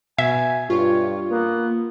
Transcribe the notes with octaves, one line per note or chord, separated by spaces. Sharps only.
B2 E5 G#5
G2 F4 C#5
A#3 B3